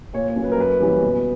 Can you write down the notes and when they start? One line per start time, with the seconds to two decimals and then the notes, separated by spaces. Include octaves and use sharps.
0.13 A#2 C#5
0.28 C#5
0.36 F#3 C#4
0.44 B4
0.52 A#4
0.57 F#2 B4
0.80 E3 G3 A#3 C#4
1.02 B2